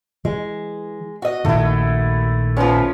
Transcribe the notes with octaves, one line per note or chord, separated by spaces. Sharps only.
E3 G#3
F#4 D#5
A#1 A#2 D#3 A3 E4
F3 B3 C#4 C5